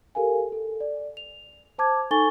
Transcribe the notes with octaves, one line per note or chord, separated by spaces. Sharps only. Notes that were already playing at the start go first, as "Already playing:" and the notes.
G4 A4 A#4 F5 G#5
A4
D5
F7
C5 A5 D6 G#6
D#4 A4 G#5 C#6 A6 G7